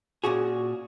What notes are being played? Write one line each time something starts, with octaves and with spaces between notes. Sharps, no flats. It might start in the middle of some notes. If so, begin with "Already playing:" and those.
A#2 C#4 F#4 G#4